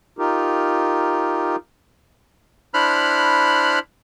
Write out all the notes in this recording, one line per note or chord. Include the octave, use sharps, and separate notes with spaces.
D#4 F4 G4 A#4
D4 E4 C5 B5 F6 F#6